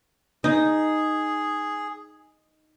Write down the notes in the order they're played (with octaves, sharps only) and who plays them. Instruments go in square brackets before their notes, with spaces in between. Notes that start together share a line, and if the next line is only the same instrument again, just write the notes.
[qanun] D#4 [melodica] G#4